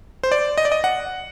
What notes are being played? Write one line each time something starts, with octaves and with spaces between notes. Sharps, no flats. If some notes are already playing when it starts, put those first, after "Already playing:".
C5
D5
D#5
D5
D#5
F#5